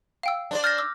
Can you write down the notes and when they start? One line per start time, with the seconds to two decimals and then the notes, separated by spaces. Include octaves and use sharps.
0.23 F5 G5 E6
0.51 D4 C5 D5
0.64 F6 G6 A6 A#6
0.78 D6 E6